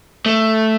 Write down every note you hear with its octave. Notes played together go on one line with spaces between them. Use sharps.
A3